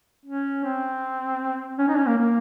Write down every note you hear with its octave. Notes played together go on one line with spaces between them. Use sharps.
C#4
C4
C#4
D#4
C#4
A#3
A#3